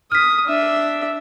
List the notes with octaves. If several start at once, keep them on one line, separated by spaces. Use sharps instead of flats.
D#6 F6 B6
D4 E5